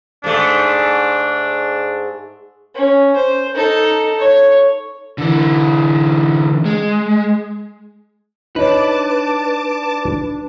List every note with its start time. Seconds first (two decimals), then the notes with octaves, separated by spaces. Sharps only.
0.24 G#2 A3 D4
2.74 C#4
3.16 C5
3.54 D#4 A4
4.19 C#5
5.18 D3 E3
6.66 G#3
8.56 D4 D#4 B4 C#5 A5 D6